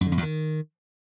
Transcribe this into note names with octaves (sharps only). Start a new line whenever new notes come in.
F#2
D3
F2
E2
D#3